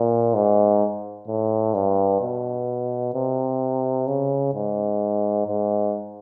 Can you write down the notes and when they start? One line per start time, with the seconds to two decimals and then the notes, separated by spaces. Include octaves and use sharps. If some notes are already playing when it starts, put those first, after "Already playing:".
Already playing: A#2
0.34 G#2
1.28 A2
1.74 G2
2.21 B2
3.14 C3
4.07 C#3
4.54 G#2
5.47 G#2